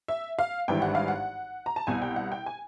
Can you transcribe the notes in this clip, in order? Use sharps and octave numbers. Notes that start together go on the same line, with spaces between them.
E5
F5
G#1 G2 E3 G5
F#5
F5
F#5
A#5
A5
C2 B2 G#5
G5
F#5
G5
G#5